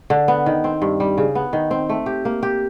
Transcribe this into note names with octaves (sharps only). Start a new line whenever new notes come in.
D3
B3
D#3
C4
G2
G3
C#3
B3
D#3
C4
A3
G4
A#3
G4